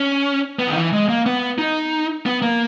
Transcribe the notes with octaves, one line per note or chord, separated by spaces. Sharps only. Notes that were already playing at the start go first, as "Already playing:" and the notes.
Already playing: C#4
B3
D#3
E3
G#3
A#3
B3
D#4
B3
A#3